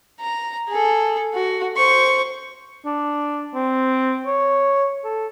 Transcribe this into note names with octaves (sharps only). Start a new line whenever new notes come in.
A#5
G#4 A4
F#4
C5 C#6
D4
C4
C#5
A4